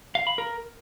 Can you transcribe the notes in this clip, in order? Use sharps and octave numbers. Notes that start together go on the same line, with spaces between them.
F5
B5
A#4